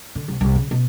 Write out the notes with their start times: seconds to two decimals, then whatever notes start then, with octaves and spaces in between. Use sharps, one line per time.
0.15 D3
0.28 C2
0.41 C2
0.56 C#3
0.71 B2